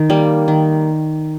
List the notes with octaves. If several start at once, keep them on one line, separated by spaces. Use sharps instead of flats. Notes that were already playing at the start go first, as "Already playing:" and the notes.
Already playing: D#3
G3 A#3
D#3